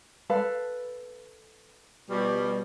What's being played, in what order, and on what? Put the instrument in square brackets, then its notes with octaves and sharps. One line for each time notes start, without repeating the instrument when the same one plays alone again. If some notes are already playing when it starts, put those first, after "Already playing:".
[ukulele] A4 B4 F5
[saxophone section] B2 F3 G3